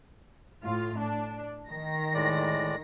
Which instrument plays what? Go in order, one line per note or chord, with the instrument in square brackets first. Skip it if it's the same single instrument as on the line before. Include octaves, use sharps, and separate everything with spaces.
[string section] A2 F4
D4
D#3 A#6
[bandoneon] A2 G#3 D5